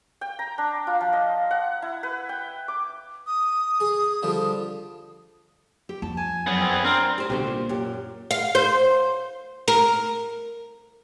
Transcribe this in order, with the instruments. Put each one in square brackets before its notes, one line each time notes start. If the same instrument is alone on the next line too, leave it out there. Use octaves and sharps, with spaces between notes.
[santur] G5
A#5
D4
F4
F3
D#5
F#5
E4
B4
G5
D6
[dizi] D#6
[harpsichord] G#4
D3 F3 G3
[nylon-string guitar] G4
[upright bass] F2 [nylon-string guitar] A5
[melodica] G#5 [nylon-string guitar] A5
[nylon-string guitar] F#2 C#5 [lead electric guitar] B3 G#4
[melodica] C4 G#5
[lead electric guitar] C4 [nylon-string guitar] D4 F4 [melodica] A#4 C6
[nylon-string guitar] G4 C5
[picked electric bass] C2 B2 D3 [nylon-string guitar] G4 C5
[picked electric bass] A#2
[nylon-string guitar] F#2 G4
[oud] F5
C5
A#4